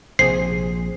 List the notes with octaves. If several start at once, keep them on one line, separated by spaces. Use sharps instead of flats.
A#1 C3 G#4 C5 C7